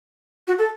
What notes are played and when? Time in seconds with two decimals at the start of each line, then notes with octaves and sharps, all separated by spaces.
0.47 F#4
0.58 A4